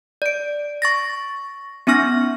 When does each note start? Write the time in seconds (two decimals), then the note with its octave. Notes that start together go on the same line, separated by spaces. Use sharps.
0.22 D5 D7
0.82 C#6 A6 A#6
1.87 B3 C#4 D#4 C#6 F6 A#6